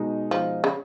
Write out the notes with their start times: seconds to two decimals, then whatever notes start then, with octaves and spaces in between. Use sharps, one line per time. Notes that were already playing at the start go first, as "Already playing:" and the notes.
Already playing: B2 G#3 D#4
0.31 F3
0.64 C#3